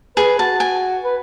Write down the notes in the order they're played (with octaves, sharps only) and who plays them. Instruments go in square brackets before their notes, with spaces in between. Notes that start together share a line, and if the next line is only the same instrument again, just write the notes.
[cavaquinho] G#4 [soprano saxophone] B4
[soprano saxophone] F#4 [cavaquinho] A5
[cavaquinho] G#5
[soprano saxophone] B4